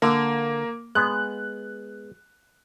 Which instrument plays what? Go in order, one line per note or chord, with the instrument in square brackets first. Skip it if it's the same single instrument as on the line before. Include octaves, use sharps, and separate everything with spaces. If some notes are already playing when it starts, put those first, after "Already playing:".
[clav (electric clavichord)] D3 [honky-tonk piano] A#3
[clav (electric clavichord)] G#3 B3 [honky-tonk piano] F#6